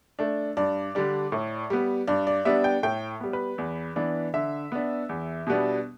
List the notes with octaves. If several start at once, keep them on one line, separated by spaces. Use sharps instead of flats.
A3 D4
G2 D5
D3 G3 D4
A2
G3 B3
G2 D5
D5
G3 B3 D4 E5
G5
A2 G5
G3 B3
B4
E2
E3 B3 D4
D3 E5
B3 D4
E2
B2 G3 B3 D4